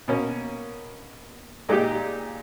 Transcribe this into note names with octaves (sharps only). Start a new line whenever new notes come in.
B2 A#3 C#4
A#2 G#3 D#4 G4